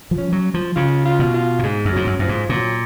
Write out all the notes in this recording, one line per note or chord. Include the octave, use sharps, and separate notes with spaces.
F3
C#4
F#3
F3
C#3 F4
F4
B2
F4
A#2
G#2 G#3
F#2
G#2 F#3
F#2
F#2 F3
G#2
A#2 F#3